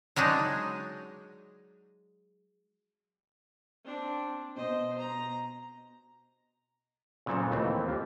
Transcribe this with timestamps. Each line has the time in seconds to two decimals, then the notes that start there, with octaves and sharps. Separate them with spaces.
0.16 F#3 G#3 D4 D#4
3.84 C4 D4
4.56 B2 C5 D#5
4.98 A#5
7.26 A#2 C#3 F#3 C4 A4
7.51 D#2 E3 A3 C4
7.87 C4 F4 G4